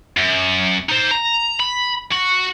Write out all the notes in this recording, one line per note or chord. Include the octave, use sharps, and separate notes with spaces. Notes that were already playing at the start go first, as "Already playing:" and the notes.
F#2
D#4 C5
A#5
B5
F#4